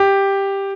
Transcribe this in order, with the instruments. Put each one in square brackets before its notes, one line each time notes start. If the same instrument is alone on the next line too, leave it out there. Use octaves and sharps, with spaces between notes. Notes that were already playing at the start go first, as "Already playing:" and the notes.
Already playing: [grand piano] G4